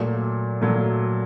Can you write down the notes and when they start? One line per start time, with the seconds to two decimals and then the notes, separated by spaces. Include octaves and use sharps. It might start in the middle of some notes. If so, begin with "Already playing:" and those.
Already playing: A#2 F#3 A3
0.61 A#2 F#3 A3